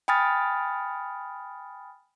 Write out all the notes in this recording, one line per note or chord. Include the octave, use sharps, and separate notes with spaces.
G5 G#5 B5 D#6 F6 A6